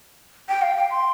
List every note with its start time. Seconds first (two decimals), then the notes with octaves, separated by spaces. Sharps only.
0.49 G5
0.62 F5
0.77 G5
0.91 C6